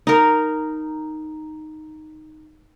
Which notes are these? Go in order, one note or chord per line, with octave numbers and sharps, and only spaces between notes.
D#4 A#4